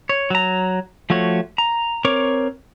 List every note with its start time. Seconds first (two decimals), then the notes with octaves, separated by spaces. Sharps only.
0.09 C#5
0.30 F#3 A#5
1.10 F3 A3 F#4 C#5
1.58 A#5
2.05 C4 A#4 C#5 C#6 D6